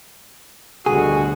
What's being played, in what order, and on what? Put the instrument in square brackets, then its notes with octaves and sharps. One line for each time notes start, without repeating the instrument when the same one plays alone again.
[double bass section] D2 D3 [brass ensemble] G2 B2 F#4 [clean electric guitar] G#4